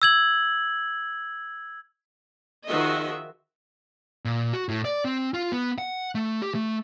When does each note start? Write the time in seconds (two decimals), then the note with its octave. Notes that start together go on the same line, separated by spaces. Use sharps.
0.02 E6 G#6 F#7
2.66 D#3 F3 F#4 G#4 D#5 E5
4.25 A#2
4.53 F#4
4.69 A2
4.85 D5
5.05 C4
5.34 F4
5.52 B3
5.78 F#5
6.15 A3
6.42 G4
6.55 A3